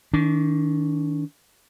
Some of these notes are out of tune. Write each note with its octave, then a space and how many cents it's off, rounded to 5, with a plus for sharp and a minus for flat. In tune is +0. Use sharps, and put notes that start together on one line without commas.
D#3 +20 D4 -35